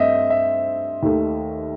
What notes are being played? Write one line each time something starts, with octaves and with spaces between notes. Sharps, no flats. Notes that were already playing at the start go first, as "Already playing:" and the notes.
Already playing: G2 A3 C4 C5 D#5 E5
E5
D#2 D#3 A3